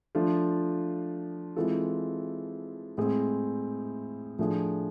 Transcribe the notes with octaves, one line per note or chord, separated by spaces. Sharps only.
F3 A3 D4 F4
E3 G#3 C4 F4 A4
A2 G#3 C4 G#4
A2 F3 A3 D4 G#4